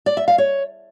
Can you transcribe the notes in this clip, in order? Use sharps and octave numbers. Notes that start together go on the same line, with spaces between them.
D5
E5
F5
C#5